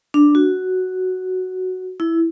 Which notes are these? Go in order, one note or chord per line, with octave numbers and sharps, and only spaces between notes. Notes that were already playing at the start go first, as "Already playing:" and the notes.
D4
F#4
E4